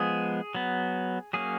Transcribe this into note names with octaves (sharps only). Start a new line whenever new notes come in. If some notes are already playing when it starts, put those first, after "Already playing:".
Already playing: F3 G#3 B3 G#4
F#3 B3
F#3 A#3 C#4 G#4